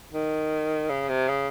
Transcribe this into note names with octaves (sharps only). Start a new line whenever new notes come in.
D#3
C#3
C3
C#3